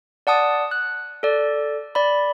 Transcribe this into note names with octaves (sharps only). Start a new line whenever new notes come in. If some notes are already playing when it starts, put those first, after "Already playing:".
D5 F#5 A5 D#6
F#6
A4 D5
D5 B5